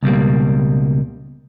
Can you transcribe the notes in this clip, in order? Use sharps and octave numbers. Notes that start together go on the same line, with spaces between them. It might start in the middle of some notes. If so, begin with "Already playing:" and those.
C#2 B2 G3 A#3